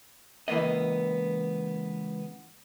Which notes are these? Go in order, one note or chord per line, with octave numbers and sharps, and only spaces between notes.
C#2 E3 A#3 B3 D#5